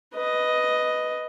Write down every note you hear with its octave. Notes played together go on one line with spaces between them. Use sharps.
B4 D#5